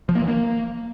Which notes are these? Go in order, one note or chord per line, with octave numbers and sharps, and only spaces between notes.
F3
A#3
E3
A#3